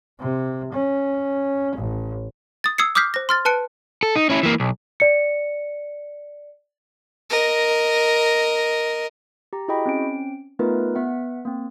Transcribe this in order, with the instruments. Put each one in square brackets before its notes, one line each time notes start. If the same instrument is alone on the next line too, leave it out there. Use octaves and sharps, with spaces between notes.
[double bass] C3
C#4
A1
[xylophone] D#6 A6
D#6 E6 G#6 C7 C#7
D6 D#6 F6 G6 B6 C7
C5 A#6
C6 F6 A6
B4 A5 F#6 C#7 D7
[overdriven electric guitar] A4
D#4
C#4 E4
E3 A#3
B1
[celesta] D5 C#7
[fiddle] A#4 D#5
[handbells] G4 A#5
E4 F#4 G#4 D#5 G5 B5
C4 C#4 D7
A3 B3 D#4 F4 A#4 B4
B3 E5 F#5
A#3 C4